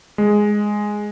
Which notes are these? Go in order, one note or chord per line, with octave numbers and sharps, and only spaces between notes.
G#3